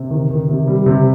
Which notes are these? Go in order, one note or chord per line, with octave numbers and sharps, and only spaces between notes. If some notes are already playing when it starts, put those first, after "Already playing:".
Already playing: C3
D#3
D#3
C3
G3
C3